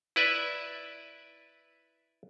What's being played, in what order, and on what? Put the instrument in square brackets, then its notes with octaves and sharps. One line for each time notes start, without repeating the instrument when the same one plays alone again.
[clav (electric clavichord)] E4 B4 D5 E5